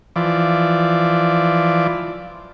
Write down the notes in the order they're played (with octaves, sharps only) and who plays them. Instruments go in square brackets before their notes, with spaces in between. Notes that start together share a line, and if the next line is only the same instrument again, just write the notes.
[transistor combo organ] E3 F3 D5